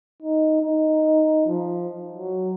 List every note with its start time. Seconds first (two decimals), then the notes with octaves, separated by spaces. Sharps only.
0.23 D#4
0.62 D#4
1.47 F3
2.13 F#3